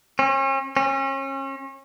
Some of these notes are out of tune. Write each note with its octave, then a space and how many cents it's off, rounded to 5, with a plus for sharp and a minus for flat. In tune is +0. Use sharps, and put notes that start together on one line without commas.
C#4 -40
C#4 -35